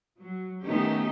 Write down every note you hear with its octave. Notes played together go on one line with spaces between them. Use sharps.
F#3
D#3 A3 B3 C#4 D#4 G4